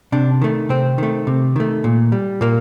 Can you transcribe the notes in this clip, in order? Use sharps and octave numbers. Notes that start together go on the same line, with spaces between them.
C3 D4
D#3 A3
C3 C4
D#3 A3
C3
D#3 A3
A#2
G3
A#2 A#3